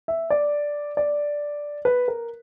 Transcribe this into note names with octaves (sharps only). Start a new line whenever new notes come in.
E5
D5
D5
B4
A#4